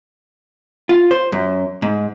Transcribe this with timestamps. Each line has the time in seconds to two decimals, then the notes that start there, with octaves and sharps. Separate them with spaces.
0.89 F4
1.11 C5
1.32 F#2
1.82 G#2